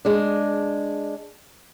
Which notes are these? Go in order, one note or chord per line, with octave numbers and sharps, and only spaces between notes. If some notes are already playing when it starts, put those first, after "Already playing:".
G#3 D4